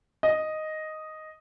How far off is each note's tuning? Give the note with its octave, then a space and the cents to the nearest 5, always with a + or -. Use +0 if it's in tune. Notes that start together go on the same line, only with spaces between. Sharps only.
D#5 +0